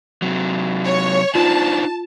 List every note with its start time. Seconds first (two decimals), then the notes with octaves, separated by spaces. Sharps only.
0.22 C3 F#3
0.85 C#5
1.35 D4 D#4 F4 C5 A5